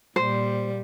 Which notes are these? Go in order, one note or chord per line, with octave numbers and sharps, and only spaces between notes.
A#2 G3 C5